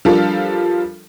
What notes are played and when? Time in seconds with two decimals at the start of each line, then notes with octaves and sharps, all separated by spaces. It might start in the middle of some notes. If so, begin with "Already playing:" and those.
0.05 F3 G3 D4 F4 A4 A#4